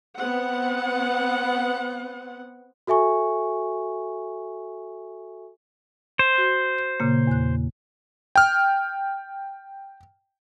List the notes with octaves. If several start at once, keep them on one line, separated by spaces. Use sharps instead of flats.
B3 C4 F#5
F#4 A4 E5 G#5 C#6
C5
F#4
G6
A#2 C#3 A#3
E2 F#6
G5 F6